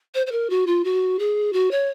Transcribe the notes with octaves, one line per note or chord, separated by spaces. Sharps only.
C5
C5
A#4
F#4
F4
F#4
G#4
F#4
C#5